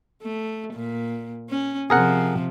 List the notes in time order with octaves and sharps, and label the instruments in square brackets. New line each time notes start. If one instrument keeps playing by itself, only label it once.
[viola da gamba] A3
A#2
C#4
[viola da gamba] C3 F3 [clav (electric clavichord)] G#4 A#4 F#5